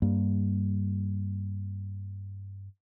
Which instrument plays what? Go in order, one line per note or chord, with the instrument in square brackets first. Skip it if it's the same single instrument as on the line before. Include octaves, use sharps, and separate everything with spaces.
[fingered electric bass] G2 G3 A#3